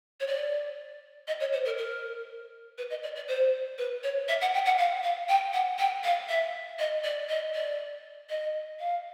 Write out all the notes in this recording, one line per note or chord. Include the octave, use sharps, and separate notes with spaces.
C#5
D5
D#5
C#5
C5
A#4
A#4
B4
D#5
D5
D5
C5
B4
C#5
E5
F#5
G5
F#5
F5
F5
G5
F#5
G5
F5
E5
D#5
D5
D#5
D5
D#5
F5